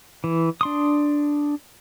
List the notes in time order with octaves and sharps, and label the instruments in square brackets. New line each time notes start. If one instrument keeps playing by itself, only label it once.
[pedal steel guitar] E3
D4 C6 D#6